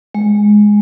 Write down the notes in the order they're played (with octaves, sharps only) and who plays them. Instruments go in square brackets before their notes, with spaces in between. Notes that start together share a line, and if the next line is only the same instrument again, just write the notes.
[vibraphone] G#3